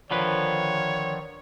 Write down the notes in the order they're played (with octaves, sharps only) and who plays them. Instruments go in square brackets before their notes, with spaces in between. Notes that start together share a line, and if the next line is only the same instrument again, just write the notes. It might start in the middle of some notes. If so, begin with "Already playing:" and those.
[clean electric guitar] D3 F3 B4 [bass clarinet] D#3 [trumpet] C#5